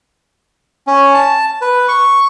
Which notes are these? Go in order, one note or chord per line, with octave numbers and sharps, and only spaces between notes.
C#4
A5
B4
C#6